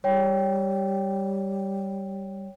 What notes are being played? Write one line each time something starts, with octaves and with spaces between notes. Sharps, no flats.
G3 C#5 G5